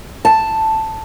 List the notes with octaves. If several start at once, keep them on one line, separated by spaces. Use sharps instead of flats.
A5